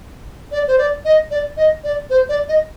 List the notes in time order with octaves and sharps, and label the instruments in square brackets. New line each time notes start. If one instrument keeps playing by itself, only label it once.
[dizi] D5
C5
D5
D#5
D5
D#5
D5
C5
D5
D#5